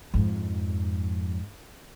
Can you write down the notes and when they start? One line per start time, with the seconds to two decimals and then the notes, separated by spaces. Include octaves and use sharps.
0.14 F2 G#2